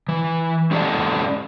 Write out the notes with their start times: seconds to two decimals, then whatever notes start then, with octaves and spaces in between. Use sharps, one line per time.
0.09 E3
0.71 G#3 C#4 G4 A4 D5 A5